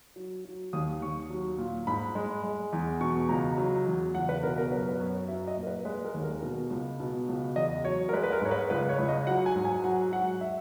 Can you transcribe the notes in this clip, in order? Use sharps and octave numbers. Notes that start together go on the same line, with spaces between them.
F#3
F#3
D#2 D#6
D#2 C#6
F#3
A#2
G#2 B5
G#3
G#3
E2
B2 C#6
C#2 A#5
F#3
E2
C#2 F#5
B4
B2 A#4
A#4
F#2 B4
B4
F#2 C#5
F#3 E5
D#5
A#2
A#4
B4
G#3 B4
A#4
D#2
A#4
B2
C#2
B2
C#2
E2 D#5
F#3 C#5
A#4
G#3 B4
B4
A#4
G#2 C#5
B4
C#2 B4
C#5
C#2
D#5
F#3 F#5
G#5
G#2
G#5
F#3 F#5
F#3 F#5
E5